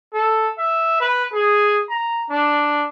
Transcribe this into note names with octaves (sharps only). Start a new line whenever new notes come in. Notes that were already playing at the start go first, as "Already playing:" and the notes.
A4
E5
B4
G#4
A#5
D4